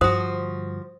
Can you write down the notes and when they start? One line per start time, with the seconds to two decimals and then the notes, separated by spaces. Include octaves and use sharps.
0.01 G2 D3 F3 F#4 C5 D#6